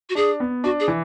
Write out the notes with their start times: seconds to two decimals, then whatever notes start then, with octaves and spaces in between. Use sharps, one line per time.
0.10 F#4
0.15 D4 G#4
0.40 B3
0.64 D4 F#4
0.80 G#4
0.88 E3